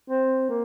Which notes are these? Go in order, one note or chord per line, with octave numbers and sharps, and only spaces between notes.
C4
A#3